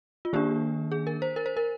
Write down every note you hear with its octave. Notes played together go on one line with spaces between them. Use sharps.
F4
D#3 A#3 D4 G4
G#4
A#4
C5
A#4
C5
A#4